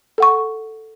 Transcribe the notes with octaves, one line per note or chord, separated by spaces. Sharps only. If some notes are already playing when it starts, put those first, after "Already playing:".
A4 F#5 C#6